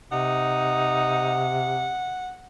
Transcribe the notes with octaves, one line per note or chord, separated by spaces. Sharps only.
C3 D#4 F#5